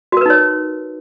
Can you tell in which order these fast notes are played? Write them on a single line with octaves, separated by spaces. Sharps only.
F#4 A#4 B4 D#4 C#5